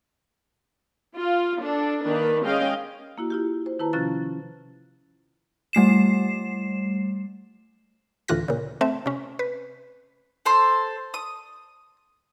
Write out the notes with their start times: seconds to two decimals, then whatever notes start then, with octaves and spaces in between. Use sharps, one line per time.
1.14 F4
1.61 D4 A4
2.05 D#3 A#3 D4 B4
2.45 G#3 C#4 G#4 D#5 F5 G5
3.18 A#3 E4 F#4
3.30 E4 F4 G4
3.66 C5
3.79 D#3 E4 B4 A5 A#5
3.93 C3 F3 C#4 F4 F#6 A6
5.73 G3 A3 C7 E7
8.28 D2 A2 E3 F4 F#6 A#6
8.48 A#2 C#3
8.81 A3 C4 E5
9.06 C3 C#4
9.39 B4
10.46 A4 C5 C6
11.14 D#6